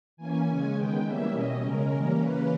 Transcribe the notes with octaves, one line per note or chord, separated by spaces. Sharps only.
E3 A#3 C#4 G#5
C#3 G#3 C#4
D#3 G#3 B3 G5
E3 G3 A#3 C#4 E5
B2 G3 C#4 D#5
C#3 G#3 C#4 A#4
E3 G3 A#3 C#4
C#3 E3 A#3 C#4 B4